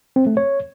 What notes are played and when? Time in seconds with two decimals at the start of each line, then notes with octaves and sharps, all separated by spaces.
0.16 C4
0.27 A3
0.37 C#5